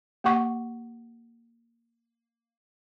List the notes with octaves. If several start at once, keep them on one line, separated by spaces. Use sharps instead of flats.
A#3 G4 F#5 C#6 D6